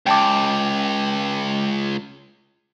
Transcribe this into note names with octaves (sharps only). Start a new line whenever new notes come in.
C#2 G5 A5 D6